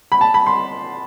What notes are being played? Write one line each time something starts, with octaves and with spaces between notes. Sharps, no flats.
B5
A5
B5
C6